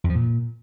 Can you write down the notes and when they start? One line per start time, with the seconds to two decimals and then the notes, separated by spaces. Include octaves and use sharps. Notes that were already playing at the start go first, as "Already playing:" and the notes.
0.04 F2
0.10 F3
0.15 A#2